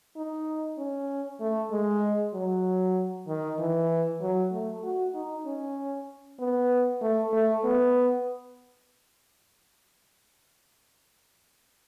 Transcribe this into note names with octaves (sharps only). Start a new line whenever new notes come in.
D#4
C#4
A3
G#3
F#3
D#3
E3
F#3
A3
F#4
D#4
C#4
B3
A3
A3
B3